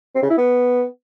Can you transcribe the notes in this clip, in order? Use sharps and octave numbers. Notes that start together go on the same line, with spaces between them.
C4
C#3
E4
B3